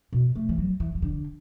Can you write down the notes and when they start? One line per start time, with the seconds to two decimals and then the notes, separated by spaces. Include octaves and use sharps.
0.13 B2
0.35 A3
0.49 E3
0.58 F#3
0.80 E3
0.95 E3
1.02 D3